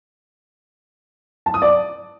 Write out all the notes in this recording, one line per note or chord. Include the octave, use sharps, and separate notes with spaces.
A5
D#6
D5